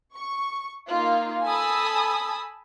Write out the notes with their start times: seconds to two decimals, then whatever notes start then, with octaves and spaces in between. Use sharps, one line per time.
0.15 C#6
0.86 A#3 D#4 F4
1.45 A4 G#5 A5 B5 D#6 E6